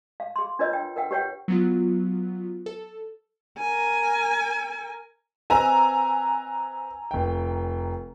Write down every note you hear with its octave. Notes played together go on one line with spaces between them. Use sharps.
F5
G#4 C6
D4 F4 A#4 B4 C#5 D#5
G5
A#4 B4 F#5 G5
G4 B4 C#5 F#5 G5
F#3 B3 F4
A4
A#4 G#5
C4 B4 D#5 G#5 A#5 E6
F1 G5